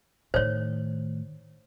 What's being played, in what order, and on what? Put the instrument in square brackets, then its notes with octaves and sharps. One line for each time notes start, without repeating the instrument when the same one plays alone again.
[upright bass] A2 D#3 [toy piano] C5 C#5